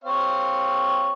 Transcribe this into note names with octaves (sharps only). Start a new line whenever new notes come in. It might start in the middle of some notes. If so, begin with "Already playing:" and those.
C4 C#5 F5